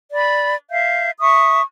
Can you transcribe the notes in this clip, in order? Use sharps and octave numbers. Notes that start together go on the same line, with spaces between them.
D5 B5
E5 F5 G6
E5 C#6 D#6